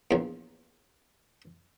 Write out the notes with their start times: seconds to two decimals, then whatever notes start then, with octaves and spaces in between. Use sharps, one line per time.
0.11 A#1 E2